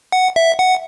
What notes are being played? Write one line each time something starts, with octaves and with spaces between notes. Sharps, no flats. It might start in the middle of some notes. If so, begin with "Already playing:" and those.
F#5
E5
F#5